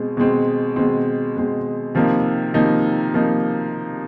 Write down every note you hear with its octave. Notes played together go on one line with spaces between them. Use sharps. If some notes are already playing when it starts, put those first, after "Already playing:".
Already playing: B2 G#3 C4
B2 G#3 C4
B2 G#3 C4
B2 G#3 C4
C3 F3 A#3 D#4
C3 F3 A#3 D#4
C3 F3 A#3 D#4